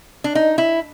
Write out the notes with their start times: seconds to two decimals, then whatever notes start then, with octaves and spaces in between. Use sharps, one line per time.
0.24 D4
0.35 D#4
0.58 E4